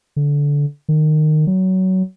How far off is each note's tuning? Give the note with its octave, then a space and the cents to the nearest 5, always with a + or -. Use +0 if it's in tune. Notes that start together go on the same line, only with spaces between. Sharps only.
D3 -20
D#3 -20
F#3 +20